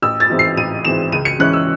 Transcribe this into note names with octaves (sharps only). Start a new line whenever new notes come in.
A1 E6
A6
G#2 E3 C4
C7
A1 D#7
G#2 E3 C4 E7
C#2 D#7
C#7
C#3 E3 G#3 C#4 F#6
E6